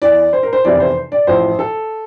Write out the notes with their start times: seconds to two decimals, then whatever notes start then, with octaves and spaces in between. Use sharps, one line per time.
0.02 E2 E3 D5
0.33 C5
0.43 A#4
0.53 C5
0.64 F1 E2 C3 E3 D5
0.80 C5
1.12 D5
1.27 A1 A2 F3 C5
1.59 A4